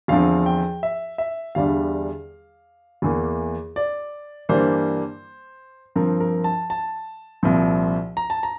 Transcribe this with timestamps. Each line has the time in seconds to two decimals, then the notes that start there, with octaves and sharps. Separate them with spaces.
0.08 E2 D3 F3 C4 F5
0.46 G5
0.83 E5
1.18 E5
1.55 E2 D3 G3 D4 F5
3.02 E2 E3 A#3
3.76 D5
4.49 G2 E3 G3 A#3 D4 C5
5.96 G2 F3 C4 A#4
6.20 A#4
6.44 A5
6.70 A5
7.43 C2 A#2 F3 C4
8.17 A#5
8.30 A5
8.43 A#5